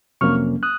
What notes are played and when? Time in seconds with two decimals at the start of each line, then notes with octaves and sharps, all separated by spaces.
0.21 F2 C3 F#3 A#3 C#4 C#6 F6
0.63 D#6 F#6